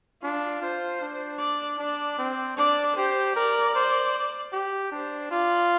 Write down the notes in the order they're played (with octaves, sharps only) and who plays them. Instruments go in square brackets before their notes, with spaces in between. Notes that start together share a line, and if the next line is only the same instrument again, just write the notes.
[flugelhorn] D4 [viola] F4
[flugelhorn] F4 [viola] C5
[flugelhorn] D4
[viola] D5
[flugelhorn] D4 [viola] D5
[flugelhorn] C4
[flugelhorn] D4 [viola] D5
[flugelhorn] G4 [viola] C5
[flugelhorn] A#4 [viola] D5
[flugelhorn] C5
G4
[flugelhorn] D4 [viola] C5
[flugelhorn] F4 [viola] D5